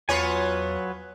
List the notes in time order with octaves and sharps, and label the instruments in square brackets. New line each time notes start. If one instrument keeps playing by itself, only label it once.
[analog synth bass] E2 [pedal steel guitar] F#3 B4 G#5 [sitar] B3 F4 C#5